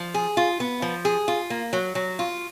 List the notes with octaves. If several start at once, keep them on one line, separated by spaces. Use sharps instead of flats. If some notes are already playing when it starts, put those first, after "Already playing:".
Already playing: F3
G#4
F4
B3
F3
G#4
F4
A#3
F#3
F#3
F4